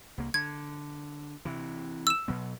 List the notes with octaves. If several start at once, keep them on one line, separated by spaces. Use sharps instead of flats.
C2 A#3
D3 G#6
C3 E3
E6 E7
B2 F#3 B3